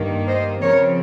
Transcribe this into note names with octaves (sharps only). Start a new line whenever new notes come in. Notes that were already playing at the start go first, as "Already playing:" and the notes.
Already playing: G2 D#3 A#3
C5 D#5
C#3 F3 C4 A#4 C#5